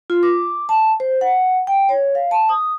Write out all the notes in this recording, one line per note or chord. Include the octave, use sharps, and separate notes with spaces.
F4
D6
A5
C5
F#5
G5
C#5
F5
A5
D#6